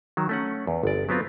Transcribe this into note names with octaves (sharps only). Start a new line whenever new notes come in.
D#3 F#3
A3 C#4 F#5
E2
G1 D5
F#3 B3 C4 F4